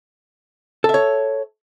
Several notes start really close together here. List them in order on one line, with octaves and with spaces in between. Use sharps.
A4 E5 C#5